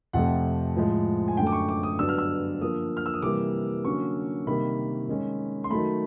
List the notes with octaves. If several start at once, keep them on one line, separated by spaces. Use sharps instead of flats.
F2 C3 F3 A3 F#5
A2 F3 G#3
G#5
F#2 D3 F#3 A3 G5
D6
C#6
D6
D#6
G2 D3 F#3 B3 D4 E6
F6
E6
D3 F3 A#3 D#6
F6
E6
D#6
C3 E3 G3 A#3 D6
D3 F#3 A#3 C#4 C#6
C3 D#3 G3 A#3 B5
D#3 G#3 C#4
C6
D#3 F#3 A3 B5